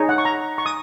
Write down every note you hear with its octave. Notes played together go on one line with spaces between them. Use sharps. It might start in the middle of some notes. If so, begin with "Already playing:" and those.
Already playing: D#4 G#4 C#5
F#5
C#6
A#5
C#6
D#6